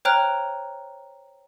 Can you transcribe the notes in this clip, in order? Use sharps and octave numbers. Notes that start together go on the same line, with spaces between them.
C5 C#5 G5 A#5 F6 F#6